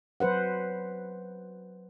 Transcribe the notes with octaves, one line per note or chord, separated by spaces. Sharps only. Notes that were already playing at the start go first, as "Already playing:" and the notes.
F#3 B4 C5 F#5